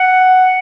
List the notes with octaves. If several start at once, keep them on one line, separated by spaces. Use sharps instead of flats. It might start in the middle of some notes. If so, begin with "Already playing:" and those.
Already playing: F#5